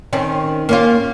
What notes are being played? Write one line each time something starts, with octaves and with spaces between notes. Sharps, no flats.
D#3 C4 C#4
A#3 C#4 F4